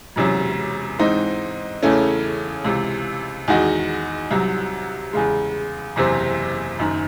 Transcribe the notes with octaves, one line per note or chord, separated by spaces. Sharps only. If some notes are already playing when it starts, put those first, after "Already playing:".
E1 E2 C3 F#3 C#4
G#2 E3 G#3 C4 D#4
E2 C#3 E3 A3 C#4
C#2 C3 E3
E2 D#3 G#3 D#4 F#4
C2 C3 F#3
E2 C#3 G#3
F#1 E2 C3 E3 C4
F#1 F#2 D#3